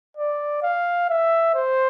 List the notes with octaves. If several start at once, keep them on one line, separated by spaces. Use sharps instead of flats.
D5
F5
E5
C5